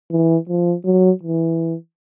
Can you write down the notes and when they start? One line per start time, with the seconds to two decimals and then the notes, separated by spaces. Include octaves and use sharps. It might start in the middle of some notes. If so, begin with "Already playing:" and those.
0.11 E3
0.49 F3
0.85 F#3
1.23 E3